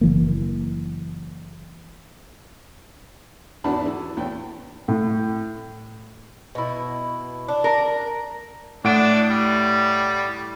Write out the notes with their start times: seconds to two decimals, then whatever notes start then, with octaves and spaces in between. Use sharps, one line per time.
0.01 F#1 E3 A#3
3.64 G#1 E2 D4 F#4 A5 B5
3.86 E3
4.17 E2 A2 G5
4.88 A2
6.55 B2 E4
7.48 D4
7.64 A#4
8.84 A2 D4 F#5 D7
9.30 G3